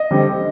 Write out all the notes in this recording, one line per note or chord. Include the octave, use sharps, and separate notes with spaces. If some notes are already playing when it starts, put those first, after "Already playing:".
Already playing: D#5
D3 G3 C4